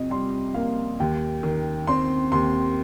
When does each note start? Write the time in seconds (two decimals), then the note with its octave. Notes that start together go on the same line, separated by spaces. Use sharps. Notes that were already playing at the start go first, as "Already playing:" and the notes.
Already playing: F2 C3 D#5
0.10 G3 C6
0.54 A#3 F5
1.00 D#2 G5
1.43 D#3
1.87 C4 C6
2.32 D#2 C6